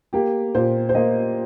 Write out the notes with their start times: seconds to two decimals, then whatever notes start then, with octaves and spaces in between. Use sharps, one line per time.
0.13 A#3 G4
0.55 A#2 C5
0.89 C5
0.95 A#3 D#5